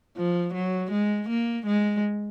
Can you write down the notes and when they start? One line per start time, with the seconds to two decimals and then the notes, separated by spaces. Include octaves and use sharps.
0.17 F3
0.54 F#3
0.91 G#3
1.29 A#3
1.66 G#3